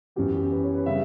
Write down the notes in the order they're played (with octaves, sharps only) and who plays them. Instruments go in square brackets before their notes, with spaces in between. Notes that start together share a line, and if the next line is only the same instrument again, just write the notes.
[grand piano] F#2 E3 B3 G4
B4
C#5
B4
C#3 G3 B3 E5